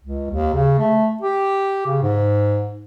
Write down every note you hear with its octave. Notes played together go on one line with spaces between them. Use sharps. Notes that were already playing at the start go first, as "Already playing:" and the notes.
C#2
D#2
C#3
A3
G4
C#3
G#2